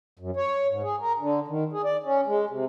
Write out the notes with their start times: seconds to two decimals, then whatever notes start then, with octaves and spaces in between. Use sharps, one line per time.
0.19 F#2
0.36 C#5
0.69 G#2
0.83 G#4
1.00 A#4
1.18 D3
1.48 D#3
1.72 G#4
1.84 D5
2.04 C#4
2.26 G#3
2.50 C3